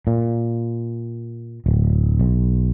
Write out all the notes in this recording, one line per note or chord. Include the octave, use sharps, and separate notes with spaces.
A#2
D1
B1